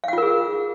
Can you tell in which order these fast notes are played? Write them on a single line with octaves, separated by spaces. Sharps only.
F5 F#5 F4 A#4 G#4